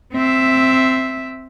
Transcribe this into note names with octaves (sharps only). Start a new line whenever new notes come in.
C4 E5